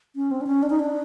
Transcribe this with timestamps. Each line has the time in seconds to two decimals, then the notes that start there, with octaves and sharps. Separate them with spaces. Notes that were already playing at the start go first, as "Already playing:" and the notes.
0.16 C#4
0.31 C4
0.41 D4
0.47 C#4
0.63 D4
0.70 D#4
0.79 D4